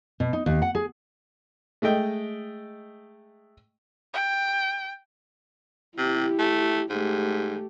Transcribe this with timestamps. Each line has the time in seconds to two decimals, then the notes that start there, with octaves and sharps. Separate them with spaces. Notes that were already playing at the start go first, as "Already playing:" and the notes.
0.20 B2
0.33 D#4
0.46 D#2
0.62 F#5
0.75 G#4
1.82 G#3 A3 D#5 G5
4.14 G5
5.98 C3 E4 G4
6.39 A3
6.90 G#2 A3 G4